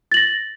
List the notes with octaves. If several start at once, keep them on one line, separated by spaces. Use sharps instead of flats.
A6 A#6 F#7